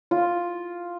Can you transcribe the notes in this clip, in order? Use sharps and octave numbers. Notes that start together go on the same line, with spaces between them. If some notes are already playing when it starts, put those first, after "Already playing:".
F4